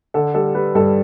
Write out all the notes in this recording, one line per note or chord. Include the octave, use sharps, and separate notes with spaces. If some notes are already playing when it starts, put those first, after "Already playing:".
D3 A4
G3 A4
G3 B4
G2 A4